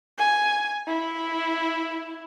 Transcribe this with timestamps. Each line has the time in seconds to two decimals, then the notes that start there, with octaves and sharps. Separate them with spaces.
0.18 G#5
0.88 E4